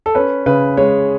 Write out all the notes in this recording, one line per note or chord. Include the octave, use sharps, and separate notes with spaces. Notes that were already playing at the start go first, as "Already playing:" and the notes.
A4
C#4 B4
C#3 B4
G#3 C#5